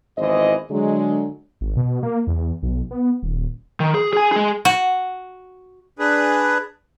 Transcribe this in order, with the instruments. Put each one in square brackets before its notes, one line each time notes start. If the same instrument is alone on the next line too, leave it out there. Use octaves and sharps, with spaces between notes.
[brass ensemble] G#1 E2 E3 C5 D#5
D3 F#3 G#3
[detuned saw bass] G#1
B2
A#3
E2
B1
B3
D#1
[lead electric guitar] D#3
G#4
G#4 G#5
G#3 G#4
[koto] F#4
[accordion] D4 G#4 B4